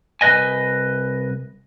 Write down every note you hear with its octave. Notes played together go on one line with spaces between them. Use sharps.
C2 F#3 B4 D#5 G#5